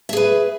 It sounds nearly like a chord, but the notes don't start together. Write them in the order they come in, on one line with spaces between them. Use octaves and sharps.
E5 G#4 B4